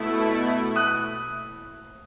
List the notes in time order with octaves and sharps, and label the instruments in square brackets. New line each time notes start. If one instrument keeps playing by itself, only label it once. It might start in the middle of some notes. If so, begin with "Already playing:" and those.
Already playing: [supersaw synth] B2 A3 E4
[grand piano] D#6 F#6